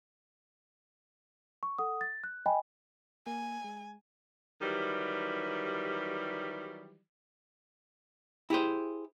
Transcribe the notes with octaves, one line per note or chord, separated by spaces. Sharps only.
C#6
A4 F#5 D#6
A6
F#6
D#5 G5 G#5 B5
A#3 G#5
G#3
D#3 E3 F#3 G3
E4 G4 G#4 C5